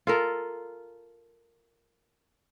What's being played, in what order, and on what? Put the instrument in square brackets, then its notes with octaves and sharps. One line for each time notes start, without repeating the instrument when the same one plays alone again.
[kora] F4 A4 A#4